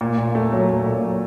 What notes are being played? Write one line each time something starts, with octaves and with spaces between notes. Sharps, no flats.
A#2
A#2
A3
F#3
A3
A#2
F#3